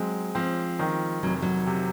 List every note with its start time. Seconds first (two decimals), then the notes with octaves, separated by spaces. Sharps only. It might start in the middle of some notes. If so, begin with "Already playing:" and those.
Already playing: F#3 G#3 C4
0.35 F3 C4
0.79 D#3
1.23 F1 F#3
1.42 F#3
1.66 C3